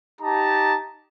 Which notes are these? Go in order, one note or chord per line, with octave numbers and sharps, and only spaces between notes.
D#4 G4 A5 A#5